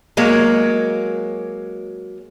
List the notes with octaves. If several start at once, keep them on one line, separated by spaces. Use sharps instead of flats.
F#3 G#3 A#3